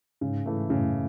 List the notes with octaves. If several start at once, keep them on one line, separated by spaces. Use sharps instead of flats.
G#2 C#3
E3 A3
F#2 A2 C#3